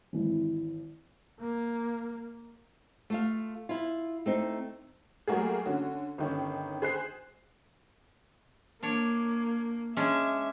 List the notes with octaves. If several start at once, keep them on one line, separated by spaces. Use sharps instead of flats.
G#1 E3
A#3
A3 F4 F5
E4 F4
A3 C4 D#4
F#3 G3 A3 A#3 F#4 G#4
D3 C#4 F#4
G1 D#3 C#4
G#4 C5 F#6 C7
A#3 D4 C#5
G#3 C#4 D4 E5